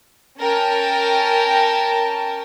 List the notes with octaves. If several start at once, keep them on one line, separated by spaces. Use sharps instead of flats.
C#4 A#4 G5 A5